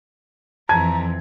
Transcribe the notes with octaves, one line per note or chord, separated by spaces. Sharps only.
F2 E3 A5 A#5 G#6